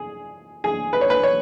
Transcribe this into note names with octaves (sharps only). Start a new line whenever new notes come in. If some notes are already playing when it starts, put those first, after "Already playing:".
Already playing: G#4
G#4
B4
C#5
B4
C#5